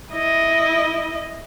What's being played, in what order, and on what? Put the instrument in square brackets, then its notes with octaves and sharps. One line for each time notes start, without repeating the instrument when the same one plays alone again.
[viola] E4 D#5